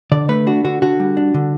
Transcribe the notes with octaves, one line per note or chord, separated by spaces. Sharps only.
D3 D5
A3 B4
D4 F#4
D3 F#4
D3 F#4
G3
D4
D3